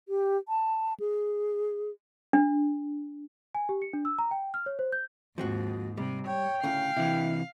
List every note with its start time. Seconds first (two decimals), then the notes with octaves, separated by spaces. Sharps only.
0.09 G4
0.48 A5
1.00 G#4
2.33 D4
3.55 G#5
3.69 G4
3.82 C#7
3.93 D4
4.05 E6
4.19 A#5
4.31 G5
4.54 F6
4.66 C#5
4.79 C5
4.92 G6
5.38 D#2 G#2 F3 C4 F#4
5.97 C3 G3
6.27 C#5 G5
6.64 D2 A2 C#3 F5
6.97 C3 E3 E4